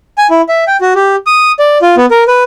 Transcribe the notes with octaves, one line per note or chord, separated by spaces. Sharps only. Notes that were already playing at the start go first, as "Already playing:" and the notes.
G#5
E4
E5
G5
F#4
G4
D#6
D5
F4
B3
A#4
B4